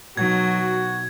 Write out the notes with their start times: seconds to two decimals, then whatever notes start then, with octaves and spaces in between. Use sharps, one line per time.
0.17 B2 F#3 D#4 F#4 G#6